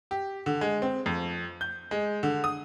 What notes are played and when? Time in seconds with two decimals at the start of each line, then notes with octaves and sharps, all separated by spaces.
0.11 G4
0.46 D3
0.61 G#3
0.82 C4
1.06 F2
1.61 G6
1.91 G#3
2.23 D3
2.44 D#6